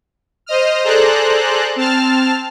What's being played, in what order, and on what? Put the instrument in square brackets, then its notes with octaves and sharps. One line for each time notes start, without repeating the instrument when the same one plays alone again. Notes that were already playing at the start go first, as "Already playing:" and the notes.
[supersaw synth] C5 D#5 D#6 F6
G#4 A4 C5 D5 A#5 F#6
C4 A5 F6